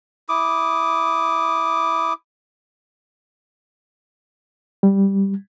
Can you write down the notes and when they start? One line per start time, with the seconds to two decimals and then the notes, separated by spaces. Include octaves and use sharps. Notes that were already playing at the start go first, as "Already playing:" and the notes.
0.29 E4 D6 D#6
4.83 G3